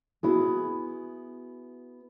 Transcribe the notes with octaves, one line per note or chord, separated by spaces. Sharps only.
B3 E4 F#4 G#4